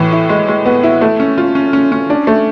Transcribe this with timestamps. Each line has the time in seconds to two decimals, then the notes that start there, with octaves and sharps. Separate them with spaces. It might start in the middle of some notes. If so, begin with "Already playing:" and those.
Already playing: A2 E3
0.12 E4
0.29 G#3
0.48 G#3
0.66 B3
0.83 E4
1.01 A3
1.20 C#4
1.38 F4
1.55 C#4
1.73 C#4
1.92 C#4
2.10 D4
2.27 A3